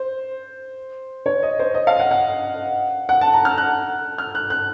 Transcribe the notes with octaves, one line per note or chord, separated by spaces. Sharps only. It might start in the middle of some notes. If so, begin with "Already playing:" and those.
Already playing: C5
C#5
D#5
C5
D#5
F5
F#5
F#5
F#5
A5
A#5
F6
F#6
F6
F#6
F#6